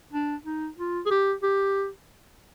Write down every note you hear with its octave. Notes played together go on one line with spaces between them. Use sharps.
D4
D#4
F4
G#4
G4
G4